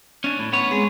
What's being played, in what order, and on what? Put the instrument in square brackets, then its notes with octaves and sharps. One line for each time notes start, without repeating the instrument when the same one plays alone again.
[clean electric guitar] C#4 D4
A2
B3 C#5
[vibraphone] G#3 C4 G#4